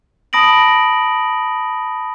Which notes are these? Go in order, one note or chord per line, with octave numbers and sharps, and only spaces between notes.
A5 B5 D#6 A#6 D7 F#7